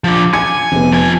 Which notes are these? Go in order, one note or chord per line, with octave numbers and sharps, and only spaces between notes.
F3 D4
G#5 D6 G#6 C#7
F1 B3
F3 G#5